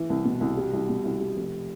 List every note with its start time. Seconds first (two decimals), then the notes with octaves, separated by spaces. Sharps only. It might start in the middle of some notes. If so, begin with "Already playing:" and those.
Already playing: E3
0.10 C2
0.25 B2
0.41 C2
0.57 G3
0.73 C2
0.89 B2
1.05 C2
1.20 G3
1.36 F1